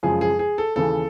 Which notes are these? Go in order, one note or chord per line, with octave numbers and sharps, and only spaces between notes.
F#2 C#3 F3 G#3 G#4
G#4
G#4
A4
D#2 C#3 E3 A4